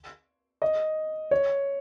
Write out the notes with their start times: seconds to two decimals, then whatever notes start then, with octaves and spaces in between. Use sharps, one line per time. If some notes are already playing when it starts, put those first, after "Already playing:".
0.62 D#5
1.31 C#5